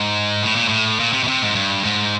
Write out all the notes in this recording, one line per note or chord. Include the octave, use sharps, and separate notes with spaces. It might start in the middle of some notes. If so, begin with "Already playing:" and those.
Already playing: G#2
A2
A#2
A2
A#2
C3
B2
C3
G#2
G2
G#2